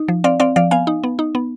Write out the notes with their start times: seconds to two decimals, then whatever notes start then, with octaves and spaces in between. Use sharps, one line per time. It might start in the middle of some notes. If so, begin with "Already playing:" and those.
Already playing: D#4
0.08 F3
0.24 C4 D5 F5
0.40 C4 D5 F5
0.56 F3 D5 F5
0.71 B3 F5 G#5
0.87 D#4
1.04 B3
1.19 D#4
1.35 B3